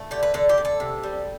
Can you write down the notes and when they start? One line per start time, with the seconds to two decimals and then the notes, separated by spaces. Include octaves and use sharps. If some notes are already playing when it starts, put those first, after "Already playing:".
Already playing: A3
0.11 D3 G4
0.23 B4
0.34 D3 A4
0.49 G4
0.58 D3
0.65 A4
0.80 C3
1.03 G3